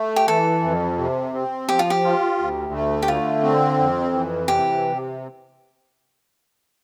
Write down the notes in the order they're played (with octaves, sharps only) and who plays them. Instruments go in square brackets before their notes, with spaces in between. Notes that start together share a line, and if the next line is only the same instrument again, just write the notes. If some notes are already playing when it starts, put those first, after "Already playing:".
Already playing: [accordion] A3
[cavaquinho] G4
[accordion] E3 [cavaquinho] A4
[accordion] F2
C3
C4
[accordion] F3 [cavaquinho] G4
[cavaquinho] F4
G4
[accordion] F4
D2
A3
[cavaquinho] G4
[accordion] D3 [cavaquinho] F4
[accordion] C4
F2
E3
[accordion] C3 [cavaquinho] G4